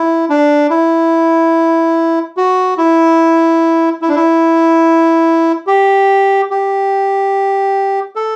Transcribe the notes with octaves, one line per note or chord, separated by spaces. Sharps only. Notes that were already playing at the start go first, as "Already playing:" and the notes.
Already playing: E4
D4
E4
F#4
E4
E4
D4
E4
G4
G4
A4